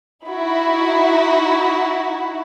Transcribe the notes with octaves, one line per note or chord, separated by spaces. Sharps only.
D#4 E4 F#4